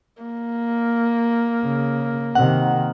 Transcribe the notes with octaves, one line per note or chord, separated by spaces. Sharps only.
A#3
C#3
C3 D#3 F#5